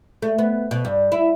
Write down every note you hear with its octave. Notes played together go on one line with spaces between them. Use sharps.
A3
B3
B2
G2
E4